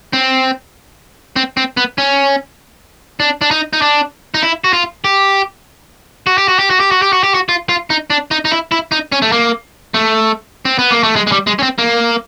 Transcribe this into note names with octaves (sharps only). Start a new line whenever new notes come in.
C4
C4
C4
B3
C#4
D4
D4
D#4
D#4
D4
D#4
E4
F#4
F4
G4
F#4
G4
F#4
G4
F#4
G4
F#4
G4
F#4
G4
F#4
F4
F4
D#4
D4
D#4
D#4
E4
E4
D#4
C#4
A3
A#3
A3
C4
B3
A#3
A3
G#3
G#3
G3
G#3
C#4
C4
A#3